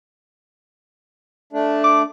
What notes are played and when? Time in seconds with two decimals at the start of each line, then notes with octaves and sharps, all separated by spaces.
1.53 A3 D4
1.84 D6